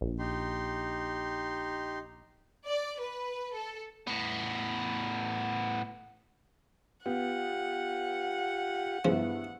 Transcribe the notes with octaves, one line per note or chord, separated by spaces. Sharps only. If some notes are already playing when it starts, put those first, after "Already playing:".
A#1
D#4 G4 C6
D5
B4
A4
A2 B3
B3 F4 G4 F#5
G2 C#3 F3 B3 E4